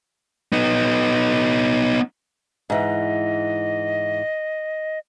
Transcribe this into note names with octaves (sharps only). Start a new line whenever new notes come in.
B3 D#4
G#2 E3 D#5